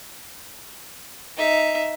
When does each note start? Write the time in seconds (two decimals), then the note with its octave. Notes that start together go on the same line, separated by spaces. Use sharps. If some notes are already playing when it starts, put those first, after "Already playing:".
1.37 D#4 E5